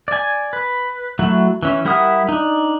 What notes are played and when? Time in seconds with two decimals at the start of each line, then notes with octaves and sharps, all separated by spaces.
0.08 D5 G#5
0.53 B4
1.19 F#3 A3 E4 F#4
1.63 E3 C#4
1.85 G3 E4 A#4 F#5 D#6
2.29 D4 D#4